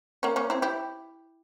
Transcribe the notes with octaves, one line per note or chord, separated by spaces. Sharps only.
A#3 C#4
A#3 C#4
C4 E4
E4 G4